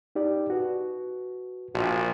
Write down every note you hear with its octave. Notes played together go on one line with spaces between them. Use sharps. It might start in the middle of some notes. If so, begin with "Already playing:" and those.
D#4 G4 D5
F#4 B4
A#1 F#4